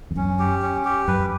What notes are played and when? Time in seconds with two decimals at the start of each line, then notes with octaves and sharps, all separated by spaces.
0.11 E2
0.16 F#2 C#4
0.39 G4
0.62 C#4
0.85 G4
1.08 F#2 B4